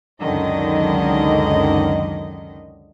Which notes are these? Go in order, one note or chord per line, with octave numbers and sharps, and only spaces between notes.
C#2 F#2 D3 D#3 D#5